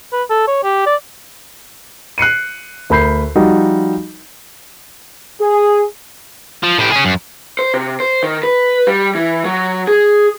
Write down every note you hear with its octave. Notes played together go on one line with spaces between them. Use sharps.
B4
A4
C#5
G4
D5
F#6 C7 C#7 D#7
D2 A#4 B5 G6 C7
F3 G3 D#4 F#4 D#5
G#4
F3
A2 G4
C#4 G#4
F#2
C5
C3
C5
D#3
B4
G3
E3
F#3
G#4